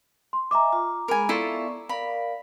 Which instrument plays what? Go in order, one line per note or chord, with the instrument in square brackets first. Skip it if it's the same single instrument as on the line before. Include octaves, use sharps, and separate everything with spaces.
[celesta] C6
[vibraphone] D#5 E5 G#5 [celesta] A#5 D6
[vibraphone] F4
[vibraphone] G#3 G#4 B5 [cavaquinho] A#4 G#5
[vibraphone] B3 D5 C#6 [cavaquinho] E4 F4 A4
[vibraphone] A#4 D5 F5 [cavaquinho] B5